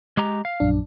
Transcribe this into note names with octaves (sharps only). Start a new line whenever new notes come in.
G#3 G4 A#5
F5
A#1 F#2 D4